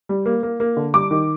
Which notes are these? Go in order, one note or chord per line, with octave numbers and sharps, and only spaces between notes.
G3
A#3
A#3
A#3
D3
G3 D6
D#3